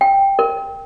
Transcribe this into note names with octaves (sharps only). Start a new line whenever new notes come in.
G5
A#4